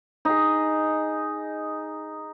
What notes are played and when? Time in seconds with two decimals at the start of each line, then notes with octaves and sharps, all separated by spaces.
0.25 D#4 G#4